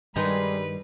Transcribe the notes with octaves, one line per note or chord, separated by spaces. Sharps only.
G2 D#3 G3 G#3 D#4 G#4 B4